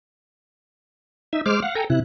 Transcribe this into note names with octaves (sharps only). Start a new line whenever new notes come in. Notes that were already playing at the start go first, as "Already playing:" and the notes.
D#4 E5
G#3 C5 D6 F6
F5 F#5
A4 G5 G#5 A#5
C3 E4 F#6